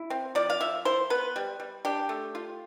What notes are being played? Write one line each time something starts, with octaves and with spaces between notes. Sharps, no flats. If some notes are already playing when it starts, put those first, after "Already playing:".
Already playing: E4
C4
F3 D5
F5
F3 E5
E4 C5
B3 B4
G3
G3
D4 G4
A3
F4